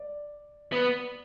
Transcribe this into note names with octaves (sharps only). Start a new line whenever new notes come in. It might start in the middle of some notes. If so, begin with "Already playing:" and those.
Already playing: D5
B3